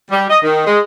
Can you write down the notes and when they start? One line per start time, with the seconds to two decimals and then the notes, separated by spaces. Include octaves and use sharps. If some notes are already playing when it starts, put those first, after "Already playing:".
0.10 G3
0.30 D#5
0.42 D#3
0.66 G#3